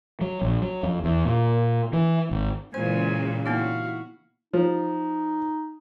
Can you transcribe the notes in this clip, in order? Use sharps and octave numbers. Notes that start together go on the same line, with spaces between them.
F#3
A#1
F#3
F2
E2
A#2
E3
G#1
A#2 C#3 E3 G#3 C5 G#5
A#3 B3 D#4 E4 F#4 F5
F3 D#4